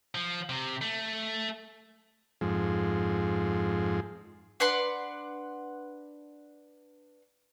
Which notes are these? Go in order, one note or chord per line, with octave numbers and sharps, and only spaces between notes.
F3
C3
A3
F2 G#2
D4 B4 F#5 C6